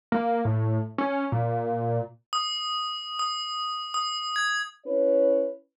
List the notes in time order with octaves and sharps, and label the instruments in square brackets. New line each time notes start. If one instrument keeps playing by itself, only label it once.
[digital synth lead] A#3
A2
C#4
A#2
[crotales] D#6
D#6
D#6
G#6
[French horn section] C#4 E4 B4 C#5